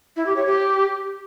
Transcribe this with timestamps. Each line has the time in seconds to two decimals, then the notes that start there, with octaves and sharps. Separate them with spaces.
0.16 E4
0.26 G4
0.36 C#5
0.46 G4